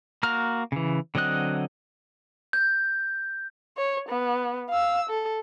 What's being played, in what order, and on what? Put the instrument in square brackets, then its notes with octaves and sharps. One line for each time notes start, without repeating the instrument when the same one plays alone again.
[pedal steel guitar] A#3 F#4 A#5 F6
C#3 E3
D3 F#3 C4 D#5 F#6
[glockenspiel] G6
[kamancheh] C#5
B3
F5 E6
A4